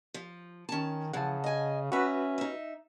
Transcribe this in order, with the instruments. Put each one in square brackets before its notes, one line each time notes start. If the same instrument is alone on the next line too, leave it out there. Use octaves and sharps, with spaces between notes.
[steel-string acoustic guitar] F3
[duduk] D#3 [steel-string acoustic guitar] C#4 A5
[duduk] C#3 [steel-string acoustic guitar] E3 F3 [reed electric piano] F#5 A5
[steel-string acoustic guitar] D#5 G#5
[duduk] C#4 [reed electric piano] F#4 B4 [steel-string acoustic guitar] E5 A#5
[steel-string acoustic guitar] D#4 E5